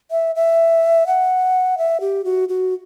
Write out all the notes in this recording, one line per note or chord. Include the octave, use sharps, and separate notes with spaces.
E5
E5
F#5
E5
G4
F#4
F#4